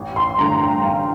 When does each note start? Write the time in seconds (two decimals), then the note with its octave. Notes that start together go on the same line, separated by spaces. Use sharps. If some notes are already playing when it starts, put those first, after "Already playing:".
Already playing: A1
0.16 C6
0.38 G2 D3 A3 A#5
0.62 G5
0.84 A1 F5